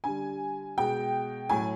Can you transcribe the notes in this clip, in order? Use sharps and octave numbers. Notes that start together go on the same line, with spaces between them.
D3 G3 G#5
B2 G#3 G5
A2 F#3 G#5